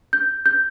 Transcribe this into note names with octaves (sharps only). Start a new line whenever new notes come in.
G6
G6